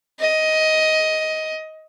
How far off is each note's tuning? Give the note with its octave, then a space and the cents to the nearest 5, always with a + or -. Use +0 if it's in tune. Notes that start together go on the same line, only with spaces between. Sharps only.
D#5 +15